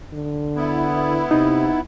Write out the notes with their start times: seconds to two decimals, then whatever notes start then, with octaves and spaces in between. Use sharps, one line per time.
0.13 D3
0.56 B3 E4
1.31 C3 D#4